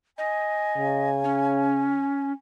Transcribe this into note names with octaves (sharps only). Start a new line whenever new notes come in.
D#5 G#5
C#3
C#4